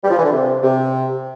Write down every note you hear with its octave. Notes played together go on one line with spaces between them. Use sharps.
G3
F3
E3
D3
C3
C3